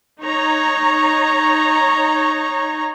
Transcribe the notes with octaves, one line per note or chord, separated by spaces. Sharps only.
D#4 C#5 A#5